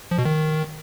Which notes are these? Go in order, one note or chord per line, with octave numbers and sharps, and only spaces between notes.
F3
B2
D#3